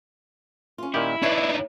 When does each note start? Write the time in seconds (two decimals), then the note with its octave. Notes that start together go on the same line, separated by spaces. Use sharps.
0.78 C#4 F4
0.94 A#2 D#3 E4 G4
1.23 D4 D#4 B4 C#5 E5